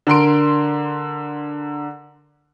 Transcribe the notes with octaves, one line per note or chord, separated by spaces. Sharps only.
D3 A#4 C6 D7